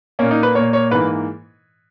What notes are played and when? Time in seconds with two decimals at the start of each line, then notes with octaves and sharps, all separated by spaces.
0.19 A#2 A#3 C#4
0.31 D#4
0.43 B4
0.55 A#2 A#3 C#5
0.73 C#5
0.91 G#2 E3 A#3 B4